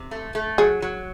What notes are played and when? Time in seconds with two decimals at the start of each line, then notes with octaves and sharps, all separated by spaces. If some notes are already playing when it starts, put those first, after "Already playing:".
Already playing: C3
0.11 A3
0.35 A3
0.58 F#3 G#4
0.82 F#3